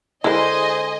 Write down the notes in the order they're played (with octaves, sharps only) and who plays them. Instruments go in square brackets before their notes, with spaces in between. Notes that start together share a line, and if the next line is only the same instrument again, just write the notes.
[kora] D3 G#3 [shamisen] E4 A#4 [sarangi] C5 [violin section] D#5 G#5